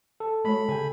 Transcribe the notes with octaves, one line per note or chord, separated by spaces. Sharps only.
A4
G#3 A3 F#4 C#5 B5
C#3 G4 G#5